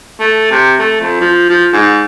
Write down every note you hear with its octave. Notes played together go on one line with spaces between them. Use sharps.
A3
C3
A3
F2
F3
F3
G#2